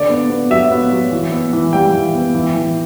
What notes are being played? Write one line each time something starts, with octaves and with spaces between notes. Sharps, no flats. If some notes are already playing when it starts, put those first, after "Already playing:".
Already playing: D3 D5
B3
B3
F#3 E5
B3
F#3
E3
B3
E3
G3 G5
E3
B3
E3
E3